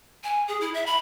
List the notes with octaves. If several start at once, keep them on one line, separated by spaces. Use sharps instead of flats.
G#5
G#4
E4
E5
B5